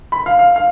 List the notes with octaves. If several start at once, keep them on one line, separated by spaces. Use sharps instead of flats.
B5
F5
F5
F5